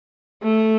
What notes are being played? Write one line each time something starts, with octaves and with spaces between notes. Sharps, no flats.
A3